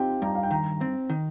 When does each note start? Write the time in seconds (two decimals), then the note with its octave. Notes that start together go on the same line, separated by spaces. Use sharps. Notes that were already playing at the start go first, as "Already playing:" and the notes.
Already playing: C4 D#4 F4 G4 G5
0.22 G2 A#5
0.35 F5
0.43 G5
0.51 D#3 A#5
0.81 C4
1.10 D#3